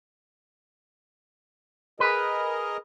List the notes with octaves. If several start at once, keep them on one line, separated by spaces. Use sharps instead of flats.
G#4 A#4 B4 D#5